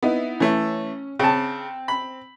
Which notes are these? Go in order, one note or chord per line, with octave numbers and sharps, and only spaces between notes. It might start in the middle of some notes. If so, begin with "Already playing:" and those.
B3 D#4 E4
E3 A3 C#4
C#3 C4 A5
B5